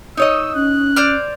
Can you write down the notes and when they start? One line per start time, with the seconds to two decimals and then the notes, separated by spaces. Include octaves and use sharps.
0.17 D#4 C#5 D#5 E6
0.55 C#4 F#6
0.96 C5 D5 F6